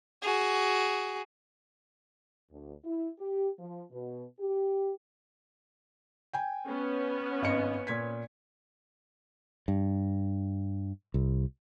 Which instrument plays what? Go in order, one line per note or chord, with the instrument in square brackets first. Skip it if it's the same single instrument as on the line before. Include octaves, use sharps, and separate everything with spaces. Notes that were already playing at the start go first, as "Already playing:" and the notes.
[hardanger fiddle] F#4 G#4
[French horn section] D2
E4
G4
F3
B2
G4
[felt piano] G5 G#5
[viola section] B3 C#4
[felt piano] G#1 D#5 C#7
A#2 G#6 B6
[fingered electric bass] G2
C2